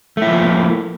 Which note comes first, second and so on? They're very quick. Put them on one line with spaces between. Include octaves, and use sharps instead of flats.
A3 E4 F3 A#3